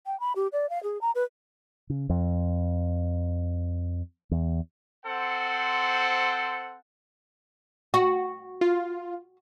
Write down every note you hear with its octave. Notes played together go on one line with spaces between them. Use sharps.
G5
B5
G4
D5
F5
G#4
A#5
B4
C#3
F2
E2
C4 A4 C5 F#5
F#4
F4